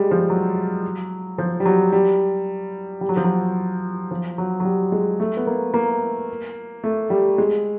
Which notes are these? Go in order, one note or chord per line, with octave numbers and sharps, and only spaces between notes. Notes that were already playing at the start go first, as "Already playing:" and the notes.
Already playing: G3 G#3
F3
F#3
F3
G3
F#3
G3
G3
F#3
F3
F#3
F3
F#3
F#3
G3
G#3
A3
B3
A#3
A#3
A3
G3
G#3